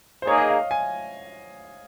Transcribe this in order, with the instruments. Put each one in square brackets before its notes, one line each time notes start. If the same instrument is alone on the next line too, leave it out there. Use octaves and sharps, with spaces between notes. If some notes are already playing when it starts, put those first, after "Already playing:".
[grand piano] C5
[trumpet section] A#3 D#4 G#4 [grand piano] C#5
[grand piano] D#5
F5
G#5